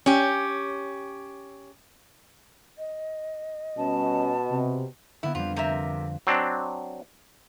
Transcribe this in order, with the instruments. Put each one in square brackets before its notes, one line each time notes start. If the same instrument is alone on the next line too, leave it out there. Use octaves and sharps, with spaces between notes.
[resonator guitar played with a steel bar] C#4 G4
[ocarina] D#5
[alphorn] B2 [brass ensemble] G3 C#4 [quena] A5
[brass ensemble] C3
[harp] D3 A#3 B3 [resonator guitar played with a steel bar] E4
[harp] F2 G3 [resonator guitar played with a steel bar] F4
[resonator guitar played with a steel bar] C3 A#4 E5
[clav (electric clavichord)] F#3 C4 D4